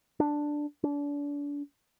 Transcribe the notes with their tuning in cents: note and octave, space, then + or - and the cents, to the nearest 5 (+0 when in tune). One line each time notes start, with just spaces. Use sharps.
D4 +5
D4 -35